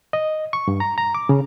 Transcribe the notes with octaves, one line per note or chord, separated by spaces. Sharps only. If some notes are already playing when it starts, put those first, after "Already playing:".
D#5
C#6
G2
A#5
A#5
D6
C#3